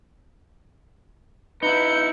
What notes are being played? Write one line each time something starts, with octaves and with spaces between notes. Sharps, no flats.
D#4 E4 B4 G6 C#7